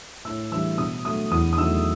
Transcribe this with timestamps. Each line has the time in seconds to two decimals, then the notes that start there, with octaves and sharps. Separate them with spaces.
0.25 A2 E6
0.51 E3 G3 E6
0.78 B2 D#6
1.05 F#3 A3 D#6
1.31 E2 D#6
1.53 D#6
1.58 D#3 F#3 A3 E6